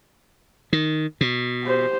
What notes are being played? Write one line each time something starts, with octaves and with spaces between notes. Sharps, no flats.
D#3
B2
G4 C5